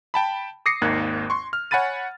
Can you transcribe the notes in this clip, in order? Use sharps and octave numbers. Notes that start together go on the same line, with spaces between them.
G5 A5 B5
D6 D#6 A#6 C7 C#7
G#1 D#2 A#3 D#4 F#6 G#6
C6 C#6
F6
C#5 F#5 G#5 B5 A6 D#7